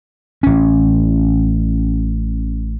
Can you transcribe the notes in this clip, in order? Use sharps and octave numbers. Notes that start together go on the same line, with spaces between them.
A1 C#4